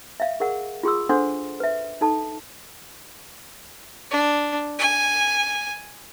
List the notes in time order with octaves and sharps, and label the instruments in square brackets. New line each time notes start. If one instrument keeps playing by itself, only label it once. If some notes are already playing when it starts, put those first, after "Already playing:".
[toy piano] E5 F5
G#4 A#4 F#5
F4 G#4 C6 D#6 E6
D4 A4 C5 F#5 C6 D6
B4 E5
D#4 A4 A5
[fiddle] D4
G#5